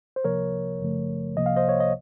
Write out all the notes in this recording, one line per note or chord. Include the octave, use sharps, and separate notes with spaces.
C5
C2 C3 F3 A#3 A#4 C#5
F#2 C#3 F3 A3
C2 C3 F3 A#3 D#5
F5
C5 D#5
C#5
D#5